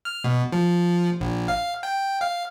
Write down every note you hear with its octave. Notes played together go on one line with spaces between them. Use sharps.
F6
B2
F3
A#1
F5
G5
F5